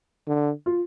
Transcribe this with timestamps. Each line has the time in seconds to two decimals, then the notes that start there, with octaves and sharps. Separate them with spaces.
0.27 D3
0.66 F4